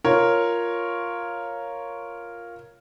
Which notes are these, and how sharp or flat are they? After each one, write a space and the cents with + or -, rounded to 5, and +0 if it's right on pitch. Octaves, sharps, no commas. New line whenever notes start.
F4 +0 A#4 +0 C#5 +0